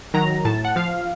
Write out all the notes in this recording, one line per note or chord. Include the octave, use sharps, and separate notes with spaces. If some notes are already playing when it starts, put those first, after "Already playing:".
D#3 F#3 A#5
A2 A5
F#5
F3 F5